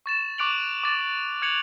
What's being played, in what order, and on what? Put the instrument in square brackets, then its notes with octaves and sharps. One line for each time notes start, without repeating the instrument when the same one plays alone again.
[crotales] C#6 A6 E7
C#6 D6 F#6 D7 F7 F#7
D6 A6
F#6 G#6 C#7 F7 F#7